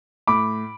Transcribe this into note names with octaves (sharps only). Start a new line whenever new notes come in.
A2 B5 D6